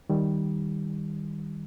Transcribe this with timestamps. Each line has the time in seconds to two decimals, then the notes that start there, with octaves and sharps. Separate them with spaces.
0.09 D#3 G3